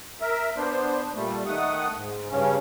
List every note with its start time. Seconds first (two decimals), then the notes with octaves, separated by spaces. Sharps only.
0.22 A#4 E5
0.57 B3 D4 C5
1.15 A#2 G3 A3
1.46 D#3 A3 F#5 D#6
1.96 G#2
2.30 G2 C#3 C#4